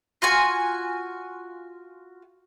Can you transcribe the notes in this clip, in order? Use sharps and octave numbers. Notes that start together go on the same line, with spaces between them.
F4 F#4 G#5